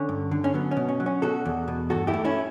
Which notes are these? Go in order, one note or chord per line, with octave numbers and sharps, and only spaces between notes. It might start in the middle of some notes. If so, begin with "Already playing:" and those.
Already playing: D3 C#4
G2
D3
C#4
F#3 B3
C#4
B2
C#4
F#3
C#4
B2 F#4 A4
E2
B2
G2 F#4 A4
E4 G4
A3
C#4 E4